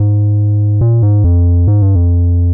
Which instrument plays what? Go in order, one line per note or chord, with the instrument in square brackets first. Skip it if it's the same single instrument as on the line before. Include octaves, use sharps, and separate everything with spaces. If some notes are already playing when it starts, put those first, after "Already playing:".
Already playing: [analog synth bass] G#2
A#2
G#2
F2
G#2
G2
F2